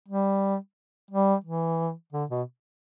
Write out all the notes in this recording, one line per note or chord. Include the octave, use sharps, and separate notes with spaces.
G3
G3
E3
D3
B2